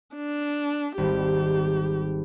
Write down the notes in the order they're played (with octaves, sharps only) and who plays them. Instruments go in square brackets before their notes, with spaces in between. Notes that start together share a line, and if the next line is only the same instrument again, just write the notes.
[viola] D4
[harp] G#1 G3 [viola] G4